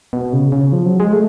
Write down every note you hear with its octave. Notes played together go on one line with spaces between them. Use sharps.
B2
C#3
C#3
F3
F#3
G#3
A3